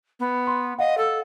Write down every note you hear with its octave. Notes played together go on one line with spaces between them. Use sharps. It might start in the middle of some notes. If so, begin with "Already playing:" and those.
B3
C6
D#5 F5 F#5
A4